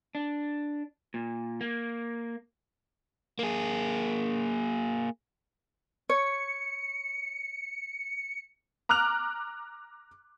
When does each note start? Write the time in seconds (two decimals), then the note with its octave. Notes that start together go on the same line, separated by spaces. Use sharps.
0.15 D4
1.14 A#2
1.61 A#3
3.39 A#3 G#4
6.09 C#5 C#7
8.89 A#5 D6 F6 F#6 F7